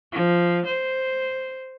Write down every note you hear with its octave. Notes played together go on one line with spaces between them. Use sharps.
F3
C5